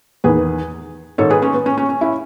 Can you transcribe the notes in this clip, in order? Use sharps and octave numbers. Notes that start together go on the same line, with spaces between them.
E2 D#3 G#4 B4
G#2 D#3 A4 C#5
G#4 B4
C#4
B3
C#4
C#4
C#4
C#4 E4